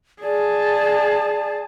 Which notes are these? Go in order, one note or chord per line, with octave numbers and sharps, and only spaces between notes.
G#4 D5 A5